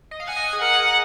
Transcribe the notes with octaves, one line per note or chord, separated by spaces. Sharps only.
D#5
F5
F#5 G#5
D#5
F#5
G#4
A#4 F#5